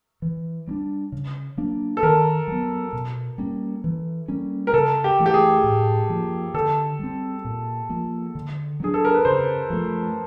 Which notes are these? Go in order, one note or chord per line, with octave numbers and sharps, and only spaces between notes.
E3
G3 A#3 D4
C#3
F#3 A#3 D4
A4
D#3 A#4
F#3 B3
B2
G3 A#3 C#4
E3
G3 A#3 C#4
A#4
C#3 A4
G4
E3 A3
G4
G#4
A2
F3 A#3
D3 A4
G3 C4
A#2
F3 A#3
D3
F#3 A3 D4 G#4
A4
A#4
B4
C#3 C5
F3 A3